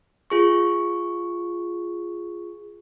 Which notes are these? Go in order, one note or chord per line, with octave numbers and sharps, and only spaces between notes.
F4 G#4 C#6